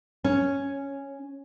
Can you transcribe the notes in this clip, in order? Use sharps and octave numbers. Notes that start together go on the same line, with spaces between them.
C#4